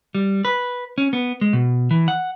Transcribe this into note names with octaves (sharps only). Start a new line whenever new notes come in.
G3
B4
C#4
B3
G#3
B2
E3
F#5